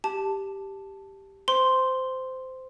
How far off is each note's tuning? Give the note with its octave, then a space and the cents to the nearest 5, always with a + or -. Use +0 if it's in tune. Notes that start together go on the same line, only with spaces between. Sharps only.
G4 +0 A5 +0
C5 -15 C6 +0